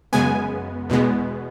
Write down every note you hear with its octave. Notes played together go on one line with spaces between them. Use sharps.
F#2 C#3 G#3 B3 G#5
E2 B2 G#3 B3